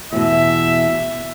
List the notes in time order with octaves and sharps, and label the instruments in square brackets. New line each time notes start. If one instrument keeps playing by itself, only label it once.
[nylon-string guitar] E2 B2 [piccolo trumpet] E5